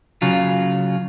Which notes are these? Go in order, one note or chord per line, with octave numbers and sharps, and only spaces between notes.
C#3 F#3 F4